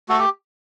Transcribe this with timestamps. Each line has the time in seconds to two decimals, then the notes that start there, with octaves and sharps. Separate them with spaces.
0.09 A3 F#4 A4
0.19 G4